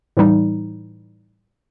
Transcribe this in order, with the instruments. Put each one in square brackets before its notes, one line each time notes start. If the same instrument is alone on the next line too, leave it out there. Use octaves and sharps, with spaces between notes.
[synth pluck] A2 E3 G3 D#4